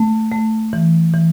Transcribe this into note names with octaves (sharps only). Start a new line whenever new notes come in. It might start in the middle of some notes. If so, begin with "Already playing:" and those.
Already playing: A3
A3
E3
E3